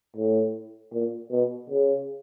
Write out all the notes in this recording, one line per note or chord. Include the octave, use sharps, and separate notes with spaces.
A2
A#2
B2
C#3